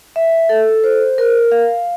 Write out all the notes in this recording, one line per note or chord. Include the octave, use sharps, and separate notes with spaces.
E5
A4
C5
A#4
F5